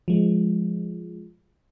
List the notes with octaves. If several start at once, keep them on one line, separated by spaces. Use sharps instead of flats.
F3 G#3